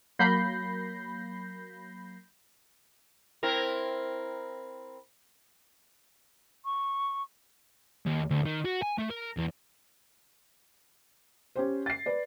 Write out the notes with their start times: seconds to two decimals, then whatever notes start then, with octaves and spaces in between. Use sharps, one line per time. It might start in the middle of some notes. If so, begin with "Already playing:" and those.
0.19 F#3 A#3 B5 G6 A#6 C7
3.43 C4 E4 A#4
6.65 C#6
8.06 D#2
8.30 D2
8.46 D#3
8.65 F#4
8.82 G#5
8.98 A3
9.10 A#4
9.37 E2
11.56 C#4 G4 C5
11.86 A6 C7
12.06 B4 D5